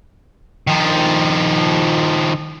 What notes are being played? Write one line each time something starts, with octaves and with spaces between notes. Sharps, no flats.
D#3 F3